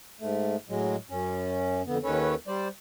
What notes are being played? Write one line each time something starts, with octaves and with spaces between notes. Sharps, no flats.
G#2 A3
A2 F#3 G#3
F#2 C#4
F2 D3 B3
D#2 D#3 C#4 A4 B4 C#5
G3 C5 D5